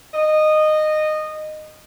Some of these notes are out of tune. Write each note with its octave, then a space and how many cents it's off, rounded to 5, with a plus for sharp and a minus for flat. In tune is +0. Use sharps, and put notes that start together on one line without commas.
D#5 -15